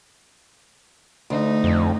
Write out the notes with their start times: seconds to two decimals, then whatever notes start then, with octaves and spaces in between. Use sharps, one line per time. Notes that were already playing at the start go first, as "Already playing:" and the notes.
1.30 D2 A3 D#4
1.64 F2